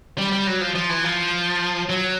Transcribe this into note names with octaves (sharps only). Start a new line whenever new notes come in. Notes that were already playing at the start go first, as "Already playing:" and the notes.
G3
G3
F#3
F3
F3
E3
F3
F#3